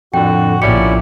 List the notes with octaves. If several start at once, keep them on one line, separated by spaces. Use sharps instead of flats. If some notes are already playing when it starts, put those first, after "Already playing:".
F2 A2 D3 F#4 G5
A#1 A#2 C#4 E4 G4 D5 C#7